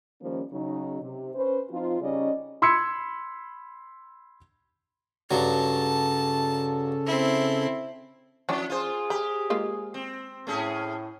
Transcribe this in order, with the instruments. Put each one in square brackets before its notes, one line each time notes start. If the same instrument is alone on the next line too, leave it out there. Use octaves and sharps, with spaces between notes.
[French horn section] D#3 F3 G3 A#3 C#4
C#3 F#3 D#4
C3
C#4 B4 C5
F3 C4 D#4 F4
C#3 G3 C#4 D#4 D5 D#5
[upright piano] B5 C6 E6 G#6 B6 C#7
[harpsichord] G2 F#3 [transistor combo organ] C#3 A4 [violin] A5
[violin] C4 E4
[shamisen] E3 C#4 D4 [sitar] F3
[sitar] F4 C5 [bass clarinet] G#4
[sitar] G4 [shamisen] B5
[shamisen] G#3 A#3 F4
[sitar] C4
[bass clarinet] A2 [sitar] A3 C#4 G#4